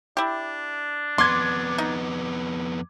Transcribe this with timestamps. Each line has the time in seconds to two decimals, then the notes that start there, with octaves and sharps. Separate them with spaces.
0.17 D4 E4 G4
1.18 F2 B3 C6 D6 G#6
1.78 D#4